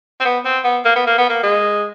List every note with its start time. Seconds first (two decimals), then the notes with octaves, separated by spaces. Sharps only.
0.20 C4
0.25 B3
0.45 C4
0.64 B3
0.85 A#3
0.96 B3
1.07 A#3
1.18 B3
1.29 A#3
1.43 G#3